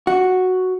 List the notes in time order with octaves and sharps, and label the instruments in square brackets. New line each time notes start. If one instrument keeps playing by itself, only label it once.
[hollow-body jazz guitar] F#4